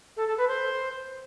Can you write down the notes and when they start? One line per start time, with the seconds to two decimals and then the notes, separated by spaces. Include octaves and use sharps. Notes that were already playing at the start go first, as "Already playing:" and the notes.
0.16 A4
0.27 A4
0.37 B4
0.48 C5